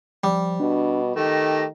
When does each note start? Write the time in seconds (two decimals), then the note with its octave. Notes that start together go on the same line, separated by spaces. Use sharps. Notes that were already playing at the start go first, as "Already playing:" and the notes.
0.24 F3 G3
0.60 B2 D4
1.16 D#3 A3 G4 A#6